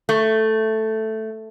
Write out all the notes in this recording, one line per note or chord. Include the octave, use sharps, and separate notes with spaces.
A3